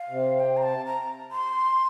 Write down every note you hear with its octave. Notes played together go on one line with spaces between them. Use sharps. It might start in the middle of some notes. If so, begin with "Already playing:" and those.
Already playing: F5
C3
G5
A#5
A5
A#5
C6